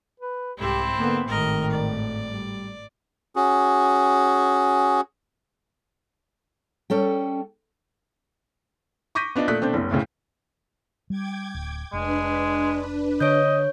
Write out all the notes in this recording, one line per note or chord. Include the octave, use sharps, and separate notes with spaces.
B4
C2 G#2 C4 E4 G4
D3 A#3 B3
G#1 A2 D#3 A#4 D#5
D5
G3
C#4 F#4 G#4
G3 C#4 A4 G5
C#6 D6 G6 A#6 B6 D#7
B3 D4 F4 D#5 F5
A#2 A3 D5 D#6 F#6 B6
B2 A3 C4 D4 G6
F#1 C2
D2 A2 C#3
G3 G5 D6 G#6
D1
F1 G#3 D4 B4
D3 C#5 D#5 G6